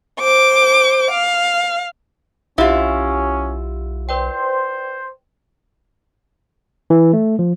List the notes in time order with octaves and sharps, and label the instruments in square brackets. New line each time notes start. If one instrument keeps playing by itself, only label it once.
[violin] C5 D6
F5
[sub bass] B1 [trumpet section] C#4 [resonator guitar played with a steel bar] E4 F4 [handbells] G4 C#5 F#5
[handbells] B4 D5 G5 [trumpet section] C5
[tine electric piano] E3
A3
F3